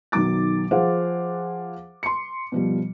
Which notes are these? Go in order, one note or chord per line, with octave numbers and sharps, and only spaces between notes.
B1 D#3 F#3 D#4 D6 A6
F3 F4 G#4 C5 F5 F#5
C6 C#7
B2 F3 G3